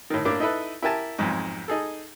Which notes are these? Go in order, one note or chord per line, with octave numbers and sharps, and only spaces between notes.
A2 D#3
A2 A#3 D4 D6
D#4 E4 A4 B4
E4 G4 A#4 G#5 A5
B1 F2 G#2
D#4 G#4 A4